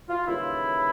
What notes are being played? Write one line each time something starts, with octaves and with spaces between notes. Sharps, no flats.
F4
D#2 C#3 E3 G3 E4